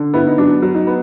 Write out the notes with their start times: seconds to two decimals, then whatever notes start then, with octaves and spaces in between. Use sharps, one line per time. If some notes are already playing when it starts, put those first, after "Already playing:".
Already playing: D3
0.14 B3 E4
0.27 D#4
0.38 F#3 D4
0.62 F#3
0.75 D#4
0.87 B3